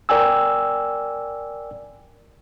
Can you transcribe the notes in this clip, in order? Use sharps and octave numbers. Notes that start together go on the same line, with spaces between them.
A#4 D5 G5 G#5 E6